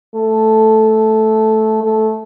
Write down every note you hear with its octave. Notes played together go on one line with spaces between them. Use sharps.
A3
A3